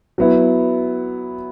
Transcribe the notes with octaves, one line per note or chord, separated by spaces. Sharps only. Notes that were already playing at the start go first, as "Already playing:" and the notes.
F#3 B3 E4